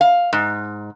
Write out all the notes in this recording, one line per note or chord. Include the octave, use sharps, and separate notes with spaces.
F5
G#2